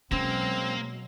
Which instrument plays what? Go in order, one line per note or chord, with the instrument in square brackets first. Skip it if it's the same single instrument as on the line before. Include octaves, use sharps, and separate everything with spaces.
[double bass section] B2 F#3 G#3 [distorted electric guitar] A#3 [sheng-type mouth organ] C4 E6 [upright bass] C#4